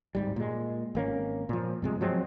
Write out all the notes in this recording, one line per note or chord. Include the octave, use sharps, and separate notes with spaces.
D1 G#2 G3
A#2 G#3
G#1 A#3 C#4
A#2 F3
G2 C3 G#3
F3 F#3 G#3 C4